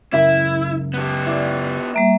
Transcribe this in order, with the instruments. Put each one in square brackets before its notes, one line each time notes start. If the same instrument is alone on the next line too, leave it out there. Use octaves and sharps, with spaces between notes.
[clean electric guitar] C#2 F#2 C#3 [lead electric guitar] E4 [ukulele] A#4 E5 G5
[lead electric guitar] B3 G4
[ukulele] E4 D5
[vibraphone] G3 A#3 E5